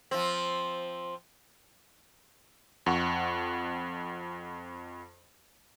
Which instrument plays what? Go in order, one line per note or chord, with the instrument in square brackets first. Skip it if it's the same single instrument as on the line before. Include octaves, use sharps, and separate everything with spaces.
[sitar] F3 C4
[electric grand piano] F2 F#5 C#6